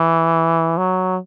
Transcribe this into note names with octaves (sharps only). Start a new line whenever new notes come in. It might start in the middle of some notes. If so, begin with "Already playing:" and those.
Already playing: E3
F#3